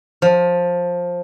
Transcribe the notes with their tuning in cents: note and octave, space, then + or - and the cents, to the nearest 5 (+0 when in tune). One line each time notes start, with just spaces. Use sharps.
F3 +15